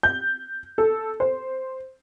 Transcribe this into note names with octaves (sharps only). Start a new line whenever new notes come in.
G6
A4
C5